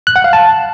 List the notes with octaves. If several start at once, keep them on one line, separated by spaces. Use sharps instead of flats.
F#6
F#5
F5
A5